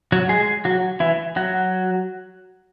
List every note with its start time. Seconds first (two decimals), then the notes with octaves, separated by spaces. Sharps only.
0.12 F#3 F#4
0.29 G#3 G#4
0.65 F#3 F#4
1.00 E3 E4
1.36 F#3 F#4